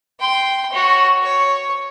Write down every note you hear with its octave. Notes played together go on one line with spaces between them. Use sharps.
G5 C6
F#4 C#5
C#5